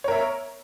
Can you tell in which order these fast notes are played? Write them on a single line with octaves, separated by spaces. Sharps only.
C#5 A#4 E5